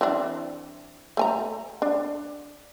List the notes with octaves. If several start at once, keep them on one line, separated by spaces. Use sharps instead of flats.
E3 C4 D4
A3 G#5 A#5
D4